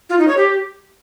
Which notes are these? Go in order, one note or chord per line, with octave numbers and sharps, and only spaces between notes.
F4
D#4
C#5
G4